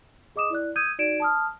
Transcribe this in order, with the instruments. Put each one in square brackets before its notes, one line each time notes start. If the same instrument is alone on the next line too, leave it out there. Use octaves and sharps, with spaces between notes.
[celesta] G#4 D#5 D6 D#6 E7
E4 D5 F#6
D#6 E6 G6 G#6 D#7
D#4 F#4 D5 G#6 D7 E7
A5 D#6 F6